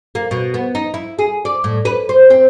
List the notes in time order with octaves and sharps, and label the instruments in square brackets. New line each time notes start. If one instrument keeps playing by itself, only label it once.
[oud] A#3
B2
B3
D#4
E4
G#4
D5
A2
B4
C5
C4